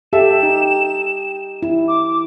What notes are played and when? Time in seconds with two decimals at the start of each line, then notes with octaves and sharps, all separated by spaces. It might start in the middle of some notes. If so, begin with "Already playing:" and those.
0.13 G4 A4 E5 E7
0.43 D#4
1.63 E4
1.88 D6